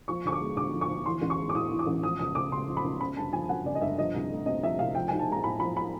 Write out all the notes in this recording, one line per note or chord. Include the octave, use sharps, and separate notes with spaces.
F3 C#6
D2 C#6
D6
G#3
D3 D6
F3
C#6
D2
E3 C6
A1
C#6
G#3
D6
A2 D#6
E3
D6
A1
F3 D#6
C#2 D#6
C#2 D6
C#3 C6
F3
B5
C#2
C#3 B5
G1 A5
F3 G#5
F#2 F#5
C#3 D5
D#5
G1 E5
F3 D#5
C2
A3
C3 D#5
F3 E5
C2 F5
F3 G5
B1 G#5
A5
G#3 A#5
A2 B5
F3 B5
B5